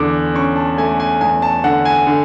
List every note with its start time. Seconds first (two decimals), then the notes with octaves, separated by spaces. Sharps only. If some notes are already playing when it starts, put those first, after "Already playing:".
Already playing: E2 D3 D6
0.34 C#4 C#6
0.56 A5
0.77 A3 G#5
1.00 G#5
1.21 E2 G#5
1.42 A5
1.64 D3 F#5
1.85 G#5
2.07 D3